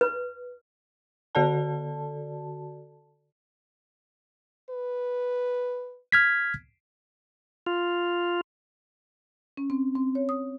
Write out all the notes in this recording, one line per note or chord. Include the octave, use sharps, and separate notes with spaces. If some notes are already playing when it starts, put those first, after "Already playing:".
B4
D3 F#4 A4 D5 A5
B4
F6 G#6 B6
F4
C#4
C4
C4
C#5
D#6